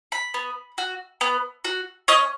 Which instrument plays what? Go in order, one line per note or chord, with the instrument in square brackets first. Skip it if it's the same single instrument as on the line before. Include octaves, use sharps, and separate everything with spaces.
[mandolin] B5
B3
F#4
B3
F#4
C#4 D#5